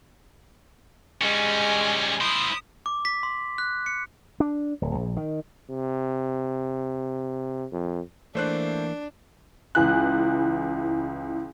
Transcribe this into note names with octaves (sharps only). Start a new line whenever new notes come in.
G3 G#3 C#4 G#5
E4 C5 D#6
D6
B6
C6
F#6
C#7
D4
D1
A#1
D#3
C3
F2
E3 A3 A#3 D4 C5 F#6
C#2 E3 G#5 F#6